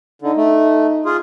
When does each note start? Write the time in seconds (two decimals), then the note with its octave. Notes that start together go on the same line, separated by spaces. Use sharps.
0.22 D3 D#4
0.37 A3
1.05 F4 G#4